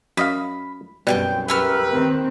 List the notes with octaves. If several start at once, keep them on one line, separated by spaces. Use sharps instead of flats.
F#2 D#5 F5 B5
C2 F#2 B2 G3 G5 A5 F#6
A3 G4 A#4 B4 E6 F6
D#2 D#3 C4